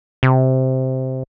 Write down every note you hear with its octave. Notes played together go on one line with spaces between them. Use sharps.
C3